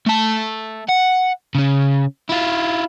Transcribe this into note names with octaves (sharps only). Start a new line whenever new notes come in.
A3 A5
F#5
C#3 C#4
E4 F4